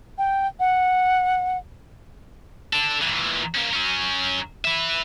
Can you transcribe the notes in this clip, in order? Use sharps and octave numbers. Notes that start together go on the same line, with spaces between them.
G5
F#5
D4 A4
A#2 E3
A#3 C#4
F#3 C#4
B4 E5